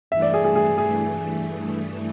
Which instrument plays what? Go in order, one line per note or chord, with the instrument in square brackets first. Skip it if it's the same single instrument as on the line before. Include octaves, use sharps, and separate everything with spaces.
[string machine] G2 E3 A3 [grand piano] E5
[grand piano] D5
G#4
G#4
G#4
G#4